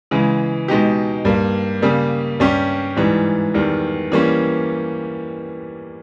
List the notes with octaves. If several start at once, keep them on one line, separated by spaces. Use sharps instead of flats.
C#3 E3 G#3
B2 G#3 D#4 G4
G2 G3 A#3
C#3 G3 A#3
G2 G3 C#4 G4
G#2 E3 G3
E2 D#3 G3
E3 G3 A#3 C#4